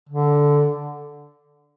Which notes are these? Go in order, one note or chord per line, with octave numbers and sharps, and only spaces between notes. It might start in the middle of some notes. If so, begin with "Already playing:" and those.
D3